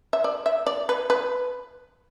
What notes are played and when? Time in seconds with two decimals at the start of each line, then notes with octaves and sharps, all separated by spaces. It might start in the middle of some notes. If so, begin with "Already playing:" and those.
0.13 E5
0.24 D5
0.46 E5
0.67 D5
0.89 B4
1.10 B4